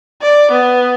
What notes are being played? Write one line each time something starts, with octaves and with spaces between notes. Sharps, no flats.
D5
B3